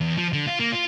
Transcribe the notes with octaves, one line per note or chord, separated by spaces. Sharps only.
E2
F3
D3
F4
A#3
F4